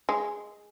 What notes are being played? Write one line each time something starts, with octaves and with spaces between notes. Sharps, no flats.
G#3